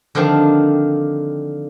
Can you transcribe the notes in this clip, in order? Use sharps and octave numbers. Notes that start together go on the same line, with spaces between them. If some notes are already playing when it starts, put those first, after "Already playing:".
D3 D#3 F3 C4 D4 G4